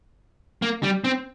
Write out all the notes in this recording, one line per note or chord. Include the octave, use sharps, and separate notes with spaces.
A#3
G3
C4